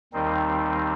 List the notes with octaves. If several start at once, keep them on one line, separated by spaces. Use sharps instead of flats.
D#2 D#3 G3 C4 D#4